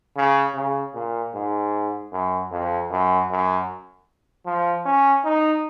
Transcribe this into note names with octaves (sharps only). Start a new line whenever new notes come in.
C#3
C#3
A#2
G#2
F#2
F2
F#2
F#2
F3
C#4
D#4